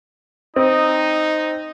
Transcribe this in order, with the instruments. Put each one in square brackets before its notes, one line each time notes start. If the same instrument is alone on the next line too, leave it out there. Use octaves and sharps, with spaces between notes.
[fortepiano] C4 [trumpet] D#4 [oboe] D#5